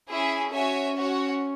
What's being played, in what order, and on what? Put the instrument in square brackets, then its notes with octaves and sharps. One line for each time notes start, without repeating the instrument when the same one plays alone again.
[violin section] C#4 G#4 E5 [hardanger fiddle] E4
[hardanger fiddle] C#4 [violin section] F#4 C#5 E5 G#5
[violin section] F#4 C#5 F#5